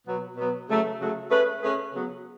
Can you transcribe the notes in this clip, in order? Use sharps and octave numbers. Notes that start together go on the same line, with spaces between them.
B2 F#3 B3
B2 F#3 B3
C#3 F#3 A3
C#3 F#3 A3
A3 C#4 G#4 B4
A3 C#4 G#4 B4
C#3 F#3 B3